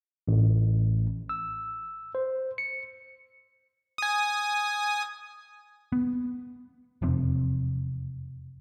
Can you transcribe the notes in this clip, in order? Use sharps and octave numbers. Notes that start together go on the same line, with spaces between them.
A1
E6
C5
C#7
G#5 D#6
B3
E1 F2 C3 C4